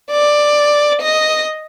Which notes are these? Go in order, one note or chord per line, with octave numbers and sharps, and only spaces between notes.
D5
D#5